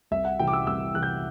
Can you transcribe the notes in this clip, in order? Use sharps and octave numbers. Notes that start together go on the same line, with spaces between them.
C2 E5
F#5
C3 E3 G5
D6
E6
C2 E6
C3 E3 F#6
G6